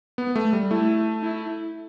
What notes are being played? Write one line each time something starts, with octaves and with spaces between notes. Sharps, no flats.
B3
A3
G3
A3 E4
E4